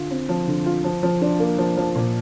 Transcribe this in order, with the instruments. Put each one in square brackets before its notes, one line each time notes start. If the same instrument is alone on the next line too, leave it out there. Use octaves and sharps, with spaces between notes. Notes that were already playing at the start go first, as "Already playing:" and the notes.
Already playing: [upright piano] D3 F4
C4
F3
D3
F4
F3
F3
D4
A#3
F3
F3
A#2